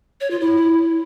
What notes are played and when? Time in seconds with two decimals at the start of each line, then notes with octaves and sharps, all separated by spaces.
0.21 C#5
0.31 F4
0.40 E4